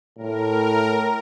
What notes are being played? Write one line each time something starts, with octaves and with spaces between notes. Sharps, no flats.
A2 A#4